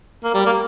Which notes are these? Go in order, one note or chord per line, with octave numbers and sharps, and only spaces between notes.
A#3
G3
A#3